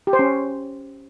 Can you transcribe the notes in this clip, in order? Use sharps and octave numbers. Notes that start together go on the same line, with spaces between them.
G4
C5
C#4